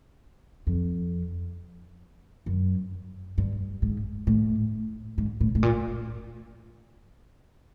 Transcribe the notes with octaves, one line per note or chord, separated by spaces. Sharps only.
F2
F#2
G2
G#2
A2
G#2
A2
A2
A#2